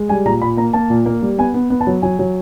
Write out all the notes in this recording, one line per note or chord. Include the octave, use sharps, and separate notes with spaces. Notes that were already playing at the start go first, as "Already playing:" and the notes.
Already playing: G#3
G3 G#5
A#2 A#5
A#2 B5
A#3 A#5
A#3 A5
A#2
A#3
G3
B3 G#5
B3
B3
A5
F#3
F#3 G#5
F#3